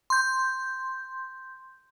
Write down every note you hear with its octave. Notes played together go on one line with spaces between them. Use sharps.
C6 G6